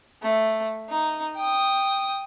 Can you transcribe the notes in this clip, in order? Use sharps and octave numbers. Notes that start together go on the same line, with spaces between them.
A3
D#4
G5 D#6